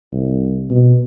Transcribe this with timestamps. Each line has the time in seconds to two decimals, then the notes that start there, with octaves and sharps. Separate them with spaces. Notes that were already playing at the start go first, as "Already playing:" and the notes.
0.12 C2
0.70 B2